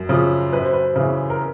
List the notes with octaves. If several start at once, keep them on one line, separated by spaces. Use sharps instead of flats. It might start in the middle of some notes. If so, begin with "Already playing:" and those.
Already playing: F#2
C#3 F3
F#2 B4
C5
B4
C#3 E3
A#4